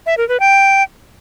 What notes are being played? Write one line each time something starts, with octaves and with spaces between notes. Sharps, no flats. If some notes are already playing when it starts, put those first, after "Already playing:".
E5
A#4
B4
G5